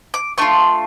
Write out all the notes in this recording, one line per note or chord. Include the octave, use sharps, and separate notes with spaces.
D6
A3 D4 F4 C#6